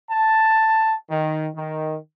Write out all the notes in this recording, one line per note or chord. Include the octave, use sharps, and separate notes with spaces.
A5
D#3
D#3